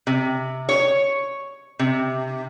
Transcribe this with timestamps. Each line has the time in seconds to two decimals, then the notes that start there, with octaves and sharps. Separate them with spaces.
0.07 C3
0.69 C#5
1.79 C3